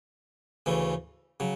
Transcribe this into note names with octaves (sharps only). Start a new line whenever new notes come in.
D2 C#3 E3 A3
C#3 F#3